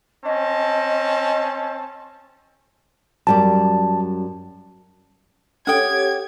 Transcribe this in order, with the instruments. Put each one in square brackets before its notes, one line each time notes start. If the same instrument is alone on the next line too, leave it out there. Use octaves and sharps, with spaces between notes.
[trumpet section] C4 C#4 A5 [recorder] D#5
[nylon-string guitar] F#2 G3 D5 [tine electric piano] A5
[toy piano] C#4 A4 [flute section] G4 C#5 [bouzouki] F#5 G5 [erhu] G#6